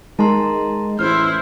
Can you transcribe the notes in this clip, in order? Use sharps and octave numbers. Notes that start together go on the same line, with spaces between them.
D#3 G#3 A5 A#5 C6
A1 E4 C5 F6